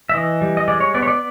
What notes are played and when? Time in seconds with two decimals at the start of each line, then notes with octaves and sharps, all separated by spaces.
0.09 E5
0.14 E3 D#5
0.42 G3
0.57 D#5
0.68 G#3 D5
0.81 C#5
0.94 B3 D5
1.02 C#5
1.08 D5